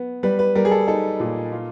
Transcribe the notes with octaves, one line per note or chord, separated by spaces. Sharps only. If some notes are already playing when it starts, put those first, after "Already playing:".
Already playing: B3
G3 B4
B4
G3 A#4
G#4
A4
D#4 A4
A#2
F4